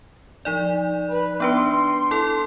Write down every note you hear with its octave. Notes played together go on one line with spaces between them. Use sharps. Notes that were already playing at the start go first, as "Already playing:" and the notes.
F3 D#4 D5
B4
B3 D4 B4 C6
E4 A4